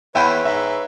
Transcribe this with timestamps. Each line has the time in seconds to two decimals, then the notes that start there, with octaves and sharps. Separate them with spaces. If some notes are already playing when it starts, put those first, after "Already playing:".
0.15 E2 B4 C#5 E5 G5 B5
0.45 G#2 E5